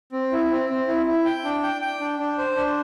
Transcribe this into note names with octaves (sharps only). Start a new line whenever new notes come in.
C4
E4
C4
C4
E4
E4
G5
D4
G5
G5
D4
D4
C5
D4